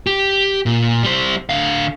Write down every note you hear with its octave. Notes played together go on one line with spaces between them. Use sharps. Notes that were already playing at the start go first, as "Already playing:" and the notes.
G4
A#2
G3 C5
D3 F5